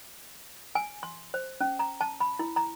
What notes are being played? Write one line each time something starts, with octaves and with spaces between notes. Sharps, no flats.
G#5
C6
C5
C#4
A#5
A5
B5
E4
A#5